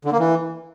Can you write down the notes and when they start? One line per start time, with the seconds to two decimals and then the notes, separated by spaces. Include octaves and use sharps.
0.05 D3
0.12 A#3
0.20 E3